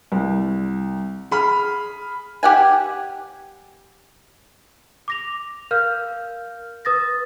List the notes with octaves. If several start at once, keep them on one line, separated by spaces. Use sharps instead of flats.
C2
G#4 B5 F6
G4 F#5 G#5
D6 A#6 F7
A#4 F5 F6 G6
B4 D#6 A6 A#6